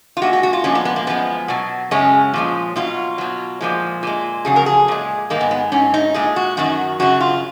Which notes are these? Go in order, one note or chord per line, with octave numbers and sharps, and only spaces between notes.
F4
A#2 G#3 F#4
F#4
F#4
F4
A#2 F3 G#3 C#4
B3
B3
A#3
F#2 F3 G#3 B3
B2 F#3
F#2 C#3 G#3 C#4
A#2 F3 G#3
B2 F#3 F4
B2 F#3
A#2 F3 G#3
A#2 G#3
F2 C#3 F#3 G#4
A#4
G#4
A#2 G#3
G#2 D#3 G#3 A#3
B3
B3
G#2 F#3 C#4
D#4
A#2 G#3 G#4
F#4
F#2 D#3 F#3 F#4
F#2 C#3 F#3 F#4
F4